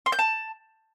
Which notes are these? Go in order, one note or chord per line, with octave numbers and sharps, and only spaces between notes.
C6
G6
A5